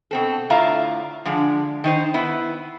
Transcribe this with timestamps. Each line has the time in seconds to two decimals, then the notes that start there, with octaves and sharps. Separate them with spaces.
0.11 B2 C4 A4
0.50 A2 D3 F4 E5 F5 A#5
1.25 D3 F3 G#3
1.84 D#3 D#4 C5
2.14 B3 E4